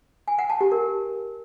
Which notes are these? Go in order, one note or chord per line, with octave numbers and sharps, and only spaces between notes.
G#5
F#5
A5
G4
A#4